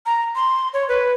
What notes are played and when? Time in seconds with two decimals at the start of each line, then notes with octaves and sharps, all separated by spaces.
0.06 A#5
0.35 C6
0.73 C#5
0.89 B4